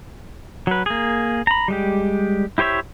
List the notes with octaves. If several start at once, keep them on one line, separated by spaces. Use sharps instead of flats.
F#3 B4
A#3 G#4
A#5 B5
G3 G#3 G4
E4 G4 C5 C#5 E5